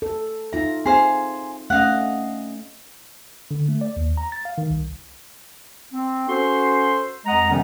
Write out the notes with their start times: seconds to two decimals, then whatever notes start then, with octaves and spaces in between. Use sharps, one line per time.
0.02 A4
0.53 D#4 F4 E5 A#5
0.86 C4 G#4 C5 F5
1.70 A3 C#4 D#5 F5 F#5
3.51 D3
3.69 A3
3.81 D5
3.96 D#2
4.17 A#5
4.32 A6
4.45 F5
4.58 D#3
4.70 C2
5.92 C4
6.28 C#4 F#4 A4 C5 C6
7.26 F2 G#3 D#5 F#5 A#5
7.49 C3 D#3 F3 G3 B3 C#4